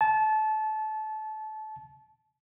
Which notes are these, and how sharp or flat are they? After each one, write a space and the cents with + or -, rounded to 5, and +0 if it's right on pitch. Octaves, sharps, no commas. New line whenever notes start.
A5 -25